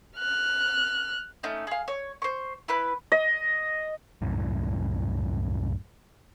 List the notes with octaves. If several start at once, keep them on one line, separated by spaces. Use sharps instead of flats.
F6 F#6
A3 C#4 D#4 G6
G#4 F5
C#5
C5 C#6
E4 B4 B5 F#6
D#5
C2 F#2 A2